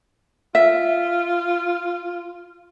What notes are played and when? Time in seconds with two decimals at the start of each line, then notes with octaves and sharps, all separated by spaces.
0.55 F4 E5